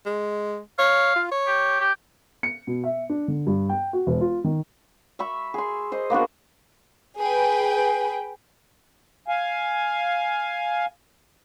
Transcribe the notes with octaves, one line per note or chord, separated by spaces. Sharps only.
G#3
C#5 F5
F4
C#5
G4
G4
C#7
B2
E5
D4
D3
G2
G5
F#4
E1
F4
D#3
E5 B5 C#6
G#4 C6
C5 D#5
A#3 B3 D4 F#4
G#4 B4 G5
F5 G#5